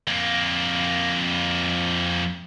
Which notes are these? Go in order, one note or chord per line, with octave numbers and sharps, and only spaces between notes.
F2 A#3